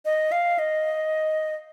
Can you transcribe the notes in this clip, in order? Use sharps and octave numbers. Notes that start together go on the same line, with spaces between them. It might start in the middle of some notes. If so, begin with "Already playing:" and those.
D#5
F5
D#5